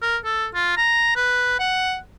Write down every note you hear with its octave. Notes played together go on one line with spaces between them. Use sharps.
A#4
A4
F4
A#5
B4
F#5